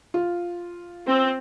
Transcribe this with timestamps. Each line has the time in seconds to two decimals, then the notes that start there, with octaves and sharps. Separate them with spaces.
0.14 F4
1.06 C4